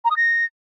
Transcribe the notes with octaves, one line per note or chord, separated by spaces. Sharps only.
A#5
D#6
A#6